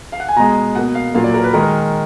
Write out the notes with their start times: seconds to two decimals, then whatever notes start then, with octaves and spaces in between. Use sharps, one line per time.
0.12 F5
0.20 F#5
0.29 G#5
0.36 B2 G#3 A#5
0.75 B2 A#3 F#5
0.95 F5
1.14 A#2 F#3 A#3 F5
1.24 D5
1.34 A#4
1.44 B4
1.54 D#3 G#3 A#4